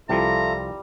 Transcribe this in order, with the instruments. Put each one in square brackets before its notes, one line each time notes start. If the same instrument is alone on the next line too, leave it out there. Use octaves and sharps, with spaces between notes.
[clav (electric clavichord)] C2 F3 [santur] G3 [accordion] F4 A4 E5 [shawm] A#5